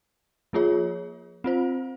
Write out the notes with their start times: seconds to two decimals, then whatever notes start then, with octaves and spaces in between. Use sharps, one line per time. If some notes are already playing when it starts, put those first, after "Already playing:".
0.53 F3 A#3 F4 G#4 C#5
1.44 C4 F4 C5